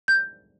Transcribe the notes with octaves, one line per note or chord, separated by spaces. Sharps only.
G6